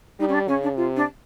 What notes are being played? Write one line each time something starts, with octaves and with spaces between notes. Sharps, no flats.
G3 D#4
C#4
D4
C#3 C#4
D4
C3 F4
D4